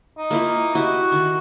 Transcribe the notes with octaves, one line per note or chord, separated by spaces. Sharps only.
D#4
A#3 E4 F4
E4 F#4 G4 D#5
D#3